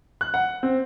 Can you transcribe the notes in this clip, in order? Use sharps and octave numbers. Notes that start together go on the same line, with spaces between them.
F#6
F#5
C4